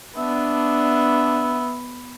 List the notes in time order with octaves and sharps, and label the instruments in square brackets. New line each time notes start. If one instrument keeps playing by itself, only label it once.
[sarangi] B3 [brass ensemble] D4 [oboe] E5